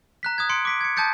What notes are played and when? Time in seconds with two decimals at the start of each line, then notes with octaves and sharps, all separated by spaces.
0.23 A#5 F#6 B6
0.38 D#6 F#6 G#6
0.49 C6 C#7 D7
0.65 D6 B6 D7
0.81 G#6 C#7
0.96 A5 D#6 G6 A6 C#7